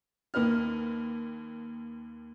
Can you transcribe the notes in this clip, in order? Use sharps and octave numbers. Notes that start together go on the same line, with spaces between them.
D#2 A#3 B4 F6